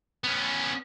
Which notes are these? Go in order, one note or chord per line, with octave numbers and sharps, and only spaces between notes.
B3 C#4